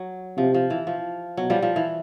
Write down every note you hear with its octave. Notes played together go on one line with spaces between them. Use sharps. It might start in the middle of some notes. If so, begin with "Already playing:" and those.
Already playing: F#3
C3 F3
F3
E3
F3
B2 F#3
F3 G3
F3
E3